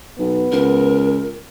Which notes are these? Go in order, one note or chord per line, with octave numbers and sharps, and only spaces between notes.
B1 B3
C#2 A#4